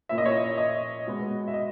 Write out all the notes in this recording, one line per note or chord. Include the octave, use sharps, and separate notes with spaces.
A#2 A#3 C#4 E4 E5
D#5
C#5 E5
D#5
B2 G#3 B3
E5
D#5